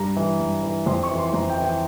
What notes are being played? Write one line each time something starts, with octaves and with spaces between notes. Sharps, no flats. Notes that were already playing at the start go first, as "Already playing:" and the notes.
Already playing: G2 A#5
E3
G2
E3
F2 C6
C#6
E3
C6
C6
F2 A#5
G5
E3
G5